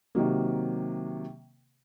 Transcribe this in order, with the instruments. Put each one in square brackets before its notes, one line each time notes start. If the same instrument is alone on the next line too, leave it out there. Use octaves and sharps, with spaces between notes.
[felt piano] C3 D#3 F#3 A#3